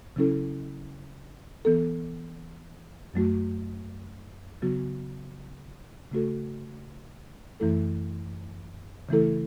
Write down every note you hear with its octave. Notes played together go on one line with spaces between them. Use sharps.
C#3 F#3 C#4 E4 A4
E3 B3 A4
F#2 F#3 A3 F#4
C#3 F#3 B3 F#4
C#3 A3 F#4 A4
F#2 E3 A3 E4 A4
C#3 E3 A3 E4 A4